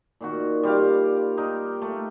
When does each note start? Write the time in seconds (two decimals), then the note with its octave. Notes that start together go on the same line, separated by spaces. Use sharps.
0.21 A#2 D#3 F#4
0.63 G3 F4 G4 F5
1.37 D#4 A#4
1.82 A3